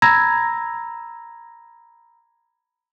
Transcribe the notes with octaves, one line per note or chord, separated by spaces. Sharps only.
A#5 B5 E6 G#6 A#6